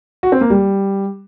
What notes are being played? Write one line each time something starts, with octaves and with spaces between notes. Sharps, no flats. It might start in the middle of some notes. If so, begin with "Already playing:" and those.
F#4
C4
A#3
G3